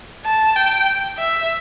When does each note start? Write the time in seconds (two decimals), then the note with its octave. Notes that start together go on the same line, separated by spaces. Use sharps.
0.25 A5
0.56 G5
1.18 E5